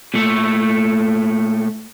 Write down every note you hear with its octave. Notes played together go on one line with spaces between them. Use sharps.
A#2 A3